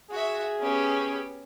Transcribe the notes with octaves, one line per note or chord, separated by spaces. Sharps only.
F#4 G#4 E5
B3 C#4 G4